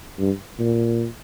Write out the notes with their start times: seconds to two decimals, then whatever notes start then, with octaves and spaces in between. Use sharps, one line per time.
0.20 G2
0.59 A#2